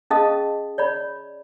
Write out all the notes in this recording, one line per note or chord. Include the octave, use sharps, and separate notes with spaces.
C#4 G#4 D#5 F5 A5 D#6
C#5 D5 B5